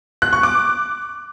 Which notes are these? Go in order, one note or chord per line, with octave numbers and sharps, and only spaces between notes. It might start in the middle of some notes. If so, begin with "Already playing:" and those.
F#6
C#6
D6